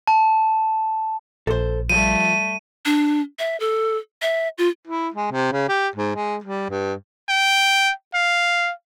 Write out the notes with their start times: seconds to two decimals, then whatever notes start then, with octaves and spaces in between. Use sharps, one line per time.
0.07 A5
1.47 A#1 A4 C5
1.90 F3 G3 A3 D#7
2.85 D4
3.39 E5
3.60 A4
4.22 E5
4.58 F4
4.88 E4
5.14 G#3
5.32 C3
5.52 C#3
5.69 G4
5.96 G#2
6.16 G#3
6.44 G3
6.70 G2
7.29 G5
8.14 F5